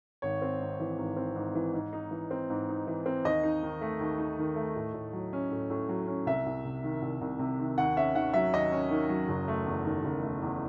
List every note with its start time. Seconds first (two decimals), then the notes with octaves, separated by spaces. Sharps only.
0.22 G#1 C#5
0.42 C4
0.60 G#2
0.80 E3
0.98 G#1
1.17 C4
1.36 G#2
1.55 E3
1.74 G#2
1.93 D#4
2.11 E3
2.31 C4
2.50 G#2
2.69 D#4
2.87 E3
3.06 C4
3.25 D#2 D#5
3.43 D#4
3.63 D#3
3.81 A3
4.01 D#2
4.18 D#4
4.39 D#3
4.56 A3
4.76 A2
4.94 A2
5.13 F#3
5.33 C#4
5.51 A2
5.70 A2
5.89 F#3
6.07 C#4
6.26 C2 E5
6.46 C2
6.65 C3
6.84 D#3
7.02 C2
7.21 C2
7.39 C3
7.59 D#3
7.78 D#2 F#5
7.96 C#4 E5
8.15 D#3 F#5
8.34 F#3 E5
8.54 D#2 D#5
8.72 C#4
8.91 D#3
9.09 F#3
9.28 F#1
9.48 A3
9.66 E2
9.85 D#3
10.04 F#1
10.22 A3
10.42 E2